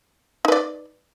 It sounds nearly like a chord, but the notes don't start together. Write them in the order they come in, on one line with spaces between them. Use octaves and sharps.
D#4 B4 D5